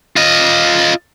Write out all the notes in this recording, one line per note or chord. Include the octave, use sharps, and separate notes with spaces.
F4 D#5